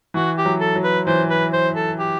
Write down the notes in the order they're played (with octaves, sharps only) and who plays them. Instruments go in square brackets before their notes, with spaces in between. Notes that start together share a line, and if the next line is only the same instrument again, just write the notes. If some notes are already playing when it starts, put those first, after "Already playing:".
[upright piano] E3 [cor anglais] F#4
[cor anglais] G4
[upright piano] F#3
[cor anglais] A4
[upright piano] F#3
[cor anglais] B4
[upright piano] E3 [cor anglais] C5
[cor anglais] B4
C5
A4
G4